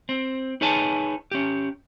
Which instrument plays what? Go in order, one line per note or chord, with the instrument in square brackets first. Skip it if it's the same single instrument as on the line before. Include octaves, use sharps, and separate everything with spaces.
[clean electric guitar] C4
D#4 G#4 B4 C#5 G#5 A5
C#4 G4